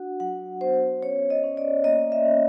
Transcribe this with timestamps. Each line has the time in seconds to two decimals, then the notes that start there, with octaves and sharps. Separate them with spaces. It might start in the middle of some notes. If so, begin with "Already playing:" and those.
Already playing: D4 F#4 F#5
0.20 F#3 F#5
0.61 B3 C5
1.02 C#4 C#5
1.30 D#5
1.43 C#4
1.57 D5
1.84 A#3 D#5
2.12 E5
2.25 C#4